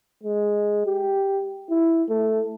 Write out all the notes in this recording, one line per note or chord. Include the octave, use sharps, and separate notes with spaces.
G#3
G4
E4
A3